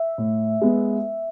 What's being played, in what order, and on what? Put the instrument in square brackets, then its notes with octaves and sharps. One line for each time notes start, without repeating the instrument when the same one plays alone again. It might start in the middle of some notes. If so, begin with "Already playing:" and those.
Already playing: [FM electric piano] E5
[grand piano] A2
G#3 B3